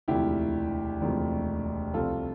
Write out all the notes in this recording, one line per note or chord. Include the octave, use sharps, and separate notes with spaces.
E1 D2 C3 F3 E4 G4
E1 D2 C3 F3
C2 C3 F3 F4 A4